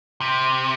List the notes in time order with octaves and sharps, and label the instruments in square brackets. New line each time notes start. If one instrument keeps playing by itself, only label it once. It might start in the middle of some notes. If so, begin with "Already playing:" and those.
[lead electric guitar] C3